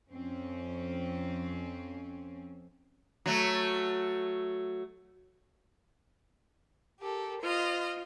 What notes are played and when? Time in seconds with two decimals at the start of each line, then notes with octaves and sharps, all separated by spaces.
0.11 F2 C4 C#4
3.26 F#3 A3
7.00 G4 A4 A#4
7.42 F4 C5 D#5 F6